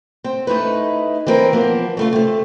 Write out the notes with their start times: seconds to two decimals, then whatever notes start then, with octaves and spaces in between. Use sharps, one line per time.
0.24 C4
0.47 A3 D#4 E4 B4
1.27 E3 C4 A#4
1.53 F3 A#3 B3
1.97 C#3 A3 F4
2.13 C3 A3